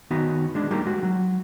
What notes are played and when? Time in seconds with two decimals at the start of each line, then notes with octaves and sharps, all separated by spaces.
0.11 D#3 B3 D#4 F#4
0.55 G#3 D4
0.71 G3 A#3 D#4 G4 A#4
0.86 G#3 F#4
1.03 F#3